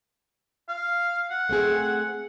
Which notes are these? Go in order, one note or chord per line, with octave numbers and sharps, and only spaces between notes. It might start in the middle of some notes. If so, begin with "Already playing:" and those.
F5
F#5
A3 C4 G#4